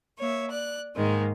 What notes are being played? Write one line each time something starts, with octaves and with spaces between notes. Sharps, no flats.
A#3 C#5 E5
D5 F#6
G#2 D#3 G#3 A#3